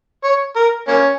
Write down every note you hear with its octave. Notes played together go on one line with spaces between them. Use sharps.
C#5
A#4
A#3 C#4